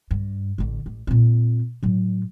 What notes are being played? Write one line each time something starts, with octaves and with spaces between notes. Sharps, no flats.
G2
A1 D3
A1
A#2 C4
A2 F#3